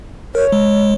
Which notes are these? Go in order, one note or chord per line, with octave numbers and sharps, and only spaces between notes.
A#4 C#5
G#3